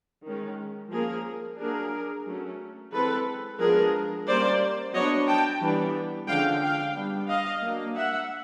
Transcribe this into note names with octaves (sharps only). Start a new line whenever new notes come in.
D#3 G#3 C#4
F3 A#3 C#4 G#4 A#4
F#3 A#3 D4 G#4 A#4
F#3 A3 C#4
E3 G#3 C4 A4 B4
F3 G#3 B3 D4 G#4 A#4
G3 A#3 C#4 C5 D5
F#3 B3 D4 C#5 D#5
G5 A5
E3 G3 B3 D4
D3 F3 G#3 C#4 F5 G5
F5 G5
G3 B3 D4
D#5 F5
F#3 A#3 D4
E5 F#5